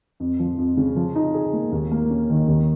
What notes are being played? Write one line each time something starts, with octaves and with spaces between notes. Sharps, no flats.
F2
F3
F2
C#3
F3
D#4
G#4
A#3
D#2
A#3
C#4
D#3
D#2